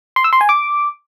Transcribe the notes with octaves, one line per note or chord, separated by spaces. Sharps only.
C6
E6
C6
G#5
D6